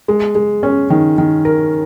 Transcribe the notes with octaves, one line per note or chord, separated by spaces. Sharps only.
G#3
G#3
C#4
D#3
D#3
A#4